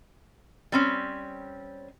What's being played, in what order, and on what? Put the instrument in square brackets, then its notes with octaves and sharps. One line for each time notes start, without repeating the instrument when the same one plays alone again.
[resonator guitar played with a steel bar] G3 C4 C#4